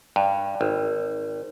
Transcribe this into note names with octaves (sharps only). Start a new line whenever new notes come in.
G2
G#1